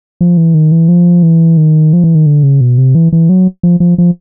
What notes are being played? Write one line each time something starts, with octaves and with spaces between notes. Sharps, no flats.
F3
E3
D#3
E3
F3
E3
D#3
F3
E3
D#3
D3
C#3
B2
C3
E3
E3
F#3
F3
F3
F3